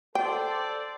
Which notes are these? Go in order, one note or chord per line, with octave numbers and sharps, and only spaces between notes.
A4 C5 D5 G5